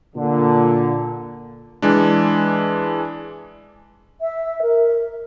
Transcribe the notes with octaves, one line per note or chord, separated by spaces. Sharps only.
A#2 D3
E3 G#3 D4
E5
A#4